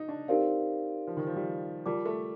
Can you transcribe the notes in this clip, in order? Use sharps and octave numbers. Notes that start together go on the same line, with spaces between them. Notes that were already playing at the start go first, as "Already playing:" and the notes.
Already playing: D#4
D4
C4 D#4 G4 A#4 D5 F5
F3
D#3
F3
G3
G3 F4 A#4 D5 A5 D6
A3